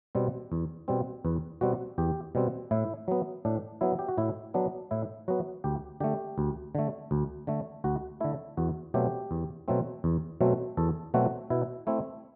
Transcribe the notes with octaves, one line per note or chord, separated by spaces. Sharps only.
B2 G3 C4
E2
B2 G3 C4
E2 B4
B2 G3 C4 F#4
E2 G4
B2 G3 C4
A2 E4
F#3 B3
A2 D4
F#3 B3 E4
G4
F#4
A2 E4
F#3 B3 D4
A2 E4
F#3 B3 F#4
D2 G4
D3 A3 G4
D2
D3 A3
D2
D3 A3
D2 F#4
D3 A3 E4
E2 F#4
B2 F#3 A3 C4 G4
E2
B2 F#3 A3 C4
E2
B2 F#3 A3 C4
E2 A4
B2 F#3 A3 C4 F#4
B2 E4
A3 C4 E4